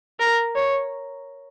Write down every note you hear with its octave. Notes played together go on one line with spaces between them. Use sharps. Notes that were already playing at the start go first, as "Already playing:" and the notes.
A#4
C#5